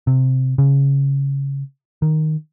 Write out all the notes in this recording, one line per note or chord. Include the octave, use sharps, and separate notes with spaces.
C3
C#3
D#3